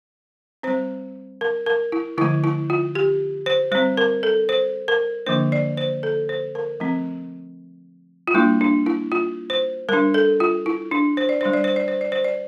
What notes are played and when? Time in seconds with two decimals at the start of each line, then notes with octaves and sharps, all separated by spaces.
0.63 G3 C4 C5
1.41 A#4
1.66 A#4
1.92 E4
2.17 D3 F3 A3 E4
2.44 E4
2.70 F4
2.95 G4
3.46 C5
3.71 G3 C5
3.75 C4
3.97 A#4
4.23 A4
4.49 C5
4.88 A#4
5.26 D3 F3 A#3 D4 C5
5.52 D5
5.77 C5
6.03 A4
6.29 C5
6.55 A#4
6.80 F3 A3 C4
8.27 F4
8.34 G3 A#3 D4 E4
8.61 D4
8.86 E4
9.12 F4
9.50 C5
9.89 G3 A#4
9.93 D4
10.14 A4
10.40 F4
10.66 E4
10.91 D4
11.17 C5
11.29 D5
11.41 G3 D4 C5
11.53 D5
11.64 C5
11.76 D5
11.88 C5
12.01 D5
12.12 C5
12.24 D5